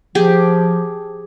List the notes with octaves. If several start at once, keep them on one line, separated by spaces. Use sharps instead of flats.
F3 G4 G#4